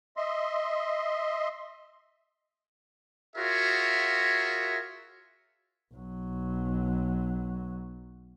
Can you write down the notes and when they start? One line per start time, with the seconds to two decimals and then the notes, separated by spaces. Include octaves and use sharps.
0.17 D#5 E5 C6
3.36 F4 F#4 G#4 A#4 C#5 E5
5.94 B1 F#3